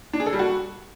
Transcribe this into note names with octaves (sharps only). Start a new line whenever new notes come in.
D4
G#4
A4
G3
F#4